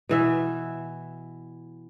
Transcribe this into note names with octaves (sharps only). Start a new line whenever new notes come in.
B2 E3 E5